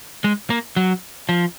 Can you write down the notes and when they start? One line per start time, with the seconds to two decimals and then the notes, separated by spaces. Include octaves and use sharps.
0.24 G#3
0.50 A#3
0.76 F#3
1.29 F3